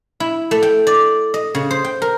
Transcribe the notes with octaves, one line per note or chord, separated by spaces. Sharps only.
E4
A3
G5
D5
D#5
C#3
C5
G5
A#4